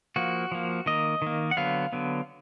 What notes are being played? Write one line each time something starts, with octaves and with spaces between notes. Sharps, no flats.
F3 A#3 F#4
F3 A#3
D#3 A#3 D#5
D#3 A#3
F#5
D3 F#3 B3 F5
D3 F#3 B3